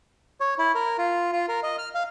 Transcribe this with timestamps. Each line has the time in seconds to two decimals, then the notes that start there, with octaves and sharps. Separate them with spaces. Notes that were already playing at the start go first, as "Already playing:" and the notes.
0.41 C#5
0.59 E4
0.75 A#4
0.98 F4
1.32 F4
1.49 A#4
1.63 D#5
1.79 F6
1.95 F5